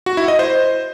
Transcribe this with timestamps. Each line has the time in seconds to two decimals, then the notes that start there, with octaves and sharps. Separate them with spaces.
0.06 F#4
0.17 E4
0.28 D#5
0.39 C5